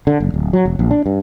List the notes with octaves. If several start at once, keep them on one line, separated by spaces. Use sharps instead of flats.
D3
F#1
D1
F#3
E1
A#1
D4
G2